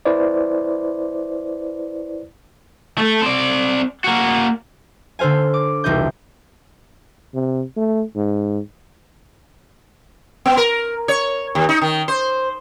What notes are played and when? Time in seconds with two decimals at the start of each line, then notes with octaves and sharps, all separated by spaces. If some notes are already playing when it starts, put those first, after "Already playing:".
0.05 E4 B4 C5 D5
2.98 A3 A4
3.22 C4 D5
4.04 A#3 F#4
5.19 D3 A4 C5 F5 G#5
5.54 D6
5.84 E1 C2 E3 D#4 D#5 G6
7.34 C3
7.77 A3
8.16 G#2
10.46 B3
10.57 A#4
11.08 C#5
11.55 D#2
11.69 D#4
11.81 D#3
12.08 C5